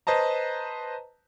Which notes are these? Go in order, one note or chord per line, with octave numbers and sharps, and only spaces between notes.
B4 C5 D#5 A5 A#5